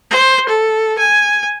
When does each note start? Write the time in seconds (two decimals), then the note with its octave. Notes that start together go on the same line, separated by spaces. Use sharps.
0.10 C5
0.49 A4
0.99 G#5